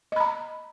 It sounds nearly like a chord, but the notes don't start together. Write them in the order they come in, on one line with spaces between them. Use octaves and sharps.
D#5 B5 A#5